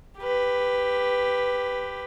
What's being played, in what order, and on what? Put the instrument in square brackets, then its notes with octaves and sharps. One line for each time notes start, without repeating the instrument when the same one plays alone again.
[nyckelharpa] G4 B4